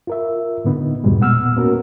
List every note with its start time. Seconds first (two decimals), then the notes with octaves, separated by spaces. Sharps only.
0.07 F4 A#4 E5
0.64 A2 D3 B3 D#4
1.04 E2 G#2 B2 G3 G#3
1.20 A#2 B3 F#5 E6 F6
1.56 A#3 B3 C#4 F#4 A#4